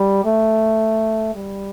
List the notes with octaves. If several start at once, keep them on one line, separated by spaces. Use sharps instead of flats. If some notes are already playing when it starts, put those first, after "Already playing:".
Already playing: G3
A3
G3